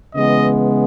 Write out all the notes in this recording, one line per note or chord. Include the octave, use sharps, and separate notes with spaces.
C#3 E3 G#3 B3 D#5